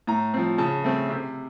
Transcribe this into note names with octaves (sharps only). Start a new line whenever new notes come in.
A2 A#5
F3 C4
C#3 A5
A3 C4
C3